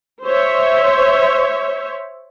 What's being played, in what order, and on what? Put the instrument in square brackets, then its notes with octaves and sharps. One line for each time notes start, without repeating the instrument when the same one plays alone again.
[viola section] C5 C#5 E5